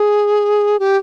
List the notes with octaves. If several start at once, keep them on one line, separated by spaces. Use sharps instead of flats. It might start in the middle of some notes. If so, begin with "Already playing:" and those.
Already playing: G#4
G4